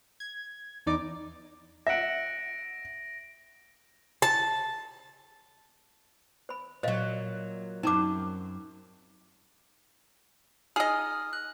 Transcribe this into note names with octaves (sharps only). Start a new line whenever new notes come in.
G#6
E2 D#4 D5 D6
E5 F#5 A#6 D7
A5
C5 B5
A#2 F#3 C5 D#5 F5
F#2 C4 D#4 A5 D6
D#4 G#4 D#5 D#6 F6
F#6